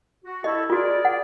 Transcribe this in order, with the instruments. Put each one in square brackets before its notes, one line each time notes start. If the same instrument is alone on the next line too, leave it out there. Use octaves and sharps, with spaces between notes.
[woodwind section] F#4
[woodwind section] E4 G4 A4 [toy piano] D#5
[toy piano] F4 F#4 [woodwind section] G#4 A#4 D5
[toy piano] F#5